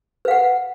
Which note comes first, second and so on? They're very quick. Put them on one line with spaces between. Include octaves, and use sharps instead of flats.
B4 F5 F#5